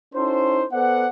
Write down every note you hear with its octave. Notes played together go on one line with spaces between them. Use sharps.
C#4 D#4 E4 F#4 A4 C5
B3 A4 C5 D5 F#5